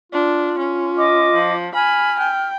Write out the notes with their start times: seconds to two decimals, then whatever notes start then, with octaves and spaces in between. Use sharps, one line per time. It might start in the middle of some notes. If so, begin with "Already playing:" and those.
0.12 D4 F4
0.58 C#4
0.98 D#5 D6
1.34 F3
1.75 G#5 B5 F6
2.19 G5